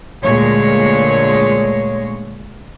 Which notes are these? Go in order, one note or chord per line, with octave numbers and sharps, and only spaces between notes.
D2 A#2 G#3 C#5